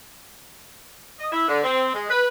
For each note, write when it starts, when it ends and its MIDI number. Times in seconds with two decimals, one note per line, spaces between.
1.19 1.27 75
1.32 1.48 64
1.48 1.60 50
1.64 1.92 60
1.94 2.05 56
2.09 2.26 71